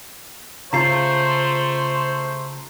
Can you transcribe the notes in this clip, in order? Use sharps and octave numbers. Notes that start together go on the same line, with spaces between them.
C#3 A3 F4 C5 A#5 C7